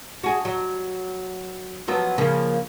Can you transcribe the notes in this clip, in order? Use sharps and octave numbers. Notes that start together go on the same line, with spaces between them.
F#4 G#4
F#3
F3 F#3 B3
C#3 F3 A#3